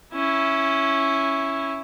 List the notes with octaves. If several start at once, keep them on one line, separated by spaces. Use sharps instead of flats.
C#4 E4